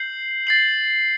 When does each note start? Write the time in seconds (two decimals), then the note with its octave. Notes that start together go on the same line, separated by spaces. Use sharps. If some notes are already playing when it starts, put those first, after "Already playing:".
Already playing: G6 C7 F#7
0.47 A6 C7 F#7